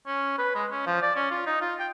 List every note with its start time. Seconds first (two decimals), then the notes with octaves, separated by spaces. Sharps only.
0.07 C#4
0.38 B4
0.55 G#3
0.71 C#4
0.86 F3
1.02 D5
1.16 C#4
1.31 F4
1.46 D#4
1.61 F4
1.79 G5